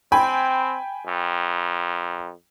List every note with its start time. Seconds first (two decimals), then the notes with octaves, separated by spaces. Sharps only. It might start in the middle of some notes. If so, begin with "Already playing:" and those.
0.12 C4 G5 G#5 B5
1.06 F2